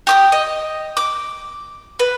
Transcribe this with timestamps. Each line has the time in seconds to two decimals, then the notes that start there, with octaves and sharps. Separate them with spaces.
0.07 G4 D6 D#6
0.32 D#5
0.97 D6
1.99 B4